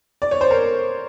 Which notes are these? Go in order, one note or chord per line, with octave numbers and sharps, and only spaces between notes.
D5
C#5
C5
A#4